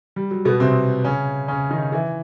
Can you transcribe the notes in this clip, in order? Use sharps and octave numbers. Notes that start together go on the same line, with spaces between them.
G3
F#3
B2 B3
C3 C4
C#3 C#4
C#3 C#4
D#3 D#4
E3 E4